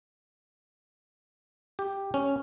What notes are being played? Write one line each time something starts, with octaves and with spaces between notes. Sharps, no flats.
G4
C#4